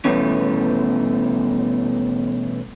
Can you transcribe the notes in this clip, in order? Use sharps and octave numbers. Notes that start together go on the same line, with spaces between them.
B2 E3 G3 A3 B3 C#4